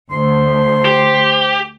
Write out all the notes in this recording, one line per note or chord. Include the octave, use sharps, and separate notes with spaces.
D2 C5 C6
G4